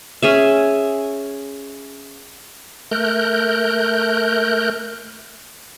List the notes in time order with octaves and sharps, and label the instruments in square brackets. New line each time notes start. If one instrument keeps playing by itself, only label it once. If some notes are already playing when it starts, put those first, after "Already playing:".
[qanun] C#4 G#4 E5
[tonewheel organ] A3 A#4 F#6 G6